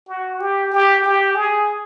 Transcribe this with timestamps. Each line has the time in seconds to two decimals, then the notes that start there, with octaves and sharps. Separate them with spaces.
0.08 F#4
0.40 G4
0.72 G4
1.04 G4
1.35 G#4